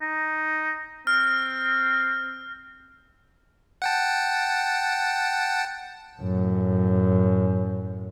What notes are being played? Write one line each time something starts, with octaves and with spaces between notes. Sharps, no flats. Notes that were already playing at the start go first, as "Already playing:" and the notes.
D#4
C4 F6
F#5 G5 A5
F#2 A2